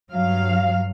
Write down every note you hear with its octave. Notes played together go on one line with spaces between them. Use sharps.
G2 F#3 F5